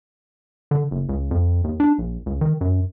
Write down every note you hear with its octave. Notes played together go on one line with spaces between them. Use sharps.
D3
F#1
C#2
F2
D#2
D4
A#1
C#2
D#3
F#2